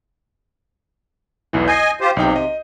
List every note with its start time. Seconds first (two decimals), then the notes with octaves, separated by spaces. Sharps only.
1.53 B1 E2 E3
1.68 D#5 G#5 G6 C7
2.01 F4 G4 C5
2.17 B1 C3 D#4 G5
2.36 D#5